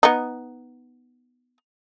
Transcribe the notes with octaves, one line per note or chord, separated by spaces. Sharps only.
B3 D#4